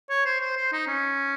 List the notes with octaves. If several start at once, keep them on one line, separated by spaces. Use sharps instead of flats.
C#5
C5
C5
C5
D#4
C#4